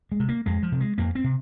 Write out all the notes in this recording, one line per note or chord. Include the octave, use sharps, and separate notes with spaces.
G#3
C3
A#3
F2 G#3
F3
C3
G#3
F2 A#3
C4
C3